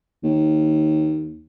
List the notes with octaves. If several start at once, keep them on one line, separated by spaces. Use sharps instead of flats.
D#2